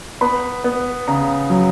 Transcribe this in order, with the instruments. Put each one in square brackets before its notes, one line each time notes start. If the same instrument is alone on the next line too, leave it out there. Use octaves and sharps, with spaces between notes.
[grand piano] B3 B5
B3
C#3 A#5
F#3